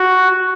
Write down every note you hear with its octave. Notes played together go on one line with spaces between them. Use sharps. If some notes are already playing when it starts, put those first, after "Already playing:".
Already playing: F#4